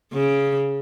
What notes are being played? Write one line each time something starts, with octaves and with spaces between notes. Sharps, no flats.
C#3